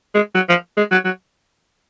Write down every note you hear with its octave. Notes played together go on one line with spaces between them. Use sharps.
G#3
F#3
F3
G#3
F#3
F#3